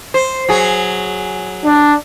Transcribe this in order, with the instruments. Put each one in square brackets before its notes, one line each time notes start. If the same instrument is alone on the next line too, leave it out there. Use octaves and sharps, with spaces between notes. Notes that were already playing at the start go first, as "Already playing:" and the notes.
[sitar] C5
F#3 G#4
[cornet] D4